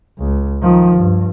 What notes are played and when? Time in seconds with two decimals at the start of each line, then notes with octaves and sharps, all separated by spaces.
0.19 C#2
0.62 D#3 F3
0.95 G2